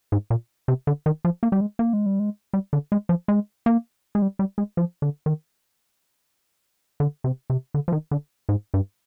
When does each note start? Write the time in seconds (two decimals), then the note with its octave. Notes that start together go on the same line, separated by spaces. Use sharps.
0.12 G#2
0.30 A#2
0.68 C3
0.87 D3
1.06 D#3
1.25 F3
1.43 A#3
1.52 G3
1.61 G#3
1.79 A#3
1.93 G#3
2.06 G3
2.19 G#3
2.54 G3
2.73 D3
2.92 G#3
3.09 F3
3.28 G#3
3.66 A#3
4.15 G#3
4.22 G3
4.39 G3
4.58 G#3
4.77 F3
5.02 D3
5.26 D#3
7.00 D3
7.24 C3
7.50 C3
7.74 D3
7.88 F3
7.92 D#3
8.11 D3
8.49 G#2
8.74 G2